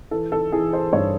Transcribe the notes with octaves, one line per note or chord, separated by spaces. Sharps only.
E3 A4
A4
E3 G#4
C5
G2 C#5